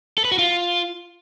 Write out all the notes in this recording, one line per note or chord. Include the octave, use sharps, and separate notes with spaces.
A4
B4
F#4
F4